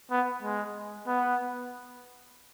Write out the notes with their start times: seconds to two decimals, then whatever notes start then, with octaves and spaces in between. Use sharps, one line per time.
0.11 B3
0.43 G#3
1.07 B3